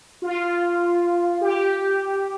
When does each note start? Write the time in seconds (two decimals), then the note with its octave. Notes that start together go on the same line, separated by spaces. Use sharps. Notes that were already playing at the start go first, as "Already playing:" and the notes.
0.22 F4
1.41 G4